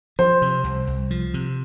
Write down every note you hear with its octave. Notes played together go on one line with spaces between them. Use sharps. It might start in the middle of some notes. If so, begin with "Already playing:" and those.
F3 C5
C3
C2
C2
F3
C3